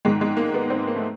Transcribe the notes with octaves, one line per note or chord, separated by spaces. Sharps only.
G#2 D#3 G#3
G#3
A#3
B3
C4
A#3
A3